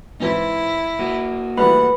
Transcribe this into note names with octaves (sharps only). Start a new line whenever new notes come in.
G#2 E3 C4 E4
A#3 F#4
E3 G3 A3 B4 F#5 B5